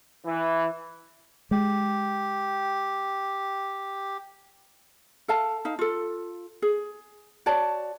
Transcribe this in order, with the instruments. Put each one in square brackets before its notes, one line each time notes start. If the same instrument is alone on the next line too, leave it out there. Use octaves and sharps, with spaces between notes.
[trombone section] E3
[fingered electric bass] G#3 [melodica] G4
[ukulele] A4 F5 A5
D#4 F5
F4 A4
G#4
F#4 C#5 D5 A5